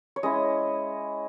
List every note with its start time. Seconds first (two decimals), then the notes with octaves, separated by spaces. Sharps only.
0.16 C#5
0.23 G#3 C#4 E4 D#5